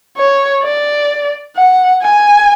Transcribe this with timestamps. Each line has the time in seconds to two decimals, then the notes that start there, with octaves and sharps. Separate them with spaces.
0.17 C#5
0.63 D5
1.56 F#5
2.02 G#5